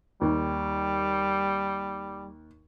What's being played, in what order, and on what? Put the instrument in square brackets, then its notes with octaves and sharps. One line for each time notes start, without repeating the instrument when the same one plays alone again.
[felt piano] D#2 [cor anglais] G3